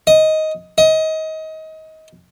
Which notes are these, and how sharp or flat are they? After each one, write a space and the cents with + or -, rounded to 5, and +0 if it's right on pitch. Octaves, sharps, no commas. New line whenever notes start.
D#5 +10
D#5 +25